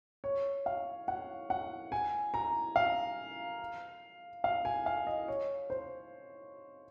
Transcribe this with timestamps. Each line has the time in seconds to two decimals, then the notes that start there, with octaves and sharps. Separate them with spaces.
0.24 C#5
0.66 F5
1.08 F#5
1.50 F#5
1.92 G#5
2.34 A#5
2.76 F5
4.44 F5
4.65 G#5
4.86 F5
5.07 D#5
5.28 C#5
5.70 C5